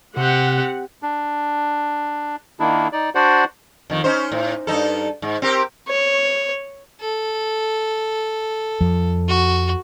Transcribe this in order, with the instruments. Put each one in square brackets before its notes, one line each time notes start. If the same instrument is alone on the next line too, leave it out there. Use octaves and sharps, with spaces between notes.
[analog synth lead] C3 [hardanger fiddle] C4 G4 [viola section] F#5
[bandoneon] D4
D#3 A#3 D4 E4
D#4 D5
D4 F#4 C5 D5 F#5
[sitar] F2 D#3
C#4 D#4 C5
A2
G2 D#4 A4
G#2
C4 G4 A#4
[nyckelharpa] C#5
[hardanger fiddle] A4
[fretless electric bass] F2 F3
[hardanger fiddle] F#4